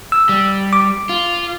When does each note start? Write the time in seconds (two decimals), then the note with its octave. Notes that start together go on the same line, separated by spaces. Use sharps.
0.12 E6
0.29 G3
0.73 D6
1.09 F4